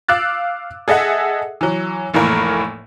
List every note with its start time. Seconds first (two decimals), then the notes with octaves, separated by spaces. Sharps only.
0.08 F5 D6 E6 F#6 A6
0.88 G#4 A4 D#5 E5 F#5
1.61 E3 F#3
2.14 F1 A2 E3 A#3 A#4